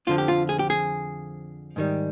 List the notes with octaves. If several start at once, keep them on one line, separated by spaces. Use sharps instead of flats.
F2 D3 F3 F4
G4
F4
G#4
G4
G#4
G#2 D#3 G3